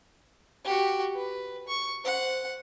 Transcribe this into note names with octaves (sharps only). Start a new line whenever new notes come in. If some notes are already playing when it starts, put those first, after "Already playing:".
F#4 G4
B4
C#6
C5 F#5